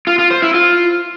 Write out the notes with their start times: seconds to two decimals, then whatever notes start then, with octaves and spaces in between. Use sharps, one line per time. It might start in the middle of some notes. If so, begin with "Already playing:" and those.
0.07 F4
0.19 F4
0.31 C5
0.42 E4
0.54 F4